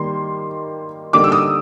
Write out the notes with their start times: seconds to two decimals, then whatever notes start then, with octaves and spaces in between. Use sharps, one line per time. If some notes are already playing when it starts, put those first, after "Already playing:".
Already playing: D#3 G3 A#3 C6
1.13 D3 G3 A#3 D#4 D6
1.24 E6
1.32 D#6